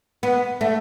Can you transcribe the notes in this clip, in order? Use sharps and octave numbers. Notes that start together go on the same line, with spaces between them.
B3
A3